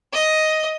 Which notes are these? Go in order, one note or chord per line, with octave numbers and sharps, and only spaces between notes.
D#5